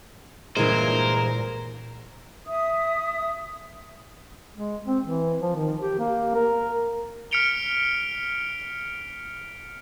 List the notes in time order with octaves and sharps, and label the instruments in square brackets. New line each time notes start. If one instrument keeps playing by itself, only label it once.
[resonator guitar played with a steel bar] G2 E3 G#3 [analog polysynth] A#2 A#5 [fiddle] A#4 [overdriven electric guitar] C5
[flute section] E5 D#6
[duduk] G#3
C4
E3
F3
D#3
G4
A#3
A#4
[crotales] F6 B6 C#7 D7 F7 G7